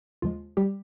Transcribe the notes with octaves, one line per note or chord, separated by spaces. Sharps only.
D#2 C#3 F3 G#3 F4
G3 G4